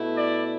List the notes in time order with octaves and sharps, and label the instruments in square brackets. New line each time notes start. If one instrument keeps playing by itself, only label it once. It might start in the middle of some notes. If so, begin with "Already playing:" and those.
Already playing: [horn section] B2 A3 E4
D5